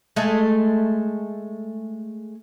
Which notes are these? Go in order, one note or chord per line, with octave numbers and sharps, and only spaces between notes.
G#3 A3